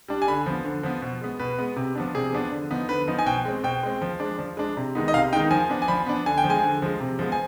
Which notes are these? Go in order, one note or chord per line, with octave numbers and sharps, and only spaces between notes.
G3 D4
G#5
D3 B5
F3 B3
D3
F3 B3
B2
G#3 B3
B2 B4
G#3 B3
C3
F3 B3 D4
C3 G#4
F3 B3 D4
D3
F3 B3 D#4
D3 B4
F3 B3 D#4
G#5
B2 G5
G#3 C4
B2 G5
G#3 C4
F3
G#3 D4
F3
G#3 D4
C3
D#3 G#3 B3 D#4
D#5
C3 F5
D#3 G#3 B3 D#4 G5
F3 G#5
B3 D4
G#5
F3 B5
B3 D4
D3 G#5
G5
F3
G#3 G#5
D3
F3 G#3
C3
F3 G#3 B3
G#5